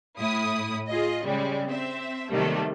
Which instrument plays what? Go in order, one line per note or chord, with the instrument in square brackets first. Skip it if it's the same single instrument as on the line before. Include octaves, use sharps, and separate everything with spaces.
[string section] A2 E4 D#6
F4 G#4 D#5
C#3 G3 G#3
C4 E5
C3 D#3 F#3 G3 A3 A#3